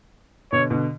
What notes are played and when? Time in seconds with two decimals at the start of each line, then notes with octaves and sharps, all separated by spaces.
0.52 B2 D3 C#5
0.70 B2 D3